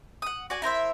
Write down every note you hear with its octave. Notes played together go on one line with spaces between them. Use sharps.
F#5 D#6
F#4 D5 G#5
E4 A#4 C5 E5